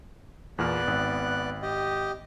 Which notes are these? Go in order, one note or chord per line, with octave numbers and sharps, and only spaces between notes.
E2 A#2 B3 D5 F6 F#6
G#1
G4 D#5